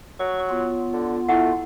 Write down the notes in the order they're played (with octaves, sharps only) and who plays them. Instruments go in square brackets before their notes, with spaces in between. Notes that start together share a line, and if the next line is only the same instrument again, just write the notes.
[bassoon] F#3 [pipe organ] C#6
[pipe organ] B3 F4
[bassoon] D3
[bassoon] A3 [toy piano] E4 F#5